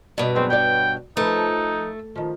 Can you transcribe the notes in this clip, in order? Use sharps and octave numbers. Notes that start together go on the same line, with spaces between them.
G2 B2 D5 D#5
F#3 G#3 B3 C4
F#4 C#5 D5 G5
F3 A3 D#4 A4 B4
D#3 F3